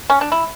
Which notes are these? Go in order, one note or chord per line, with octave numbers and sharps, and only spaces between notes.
C#4
D4
E4